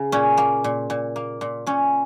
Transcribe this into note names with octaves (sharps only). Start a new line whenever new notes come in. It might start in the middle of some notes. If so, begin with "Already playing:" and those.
Already playing: C#3
A#2 C#4
A#3
A#2
A#2
A#3
A#2
A#2 C#4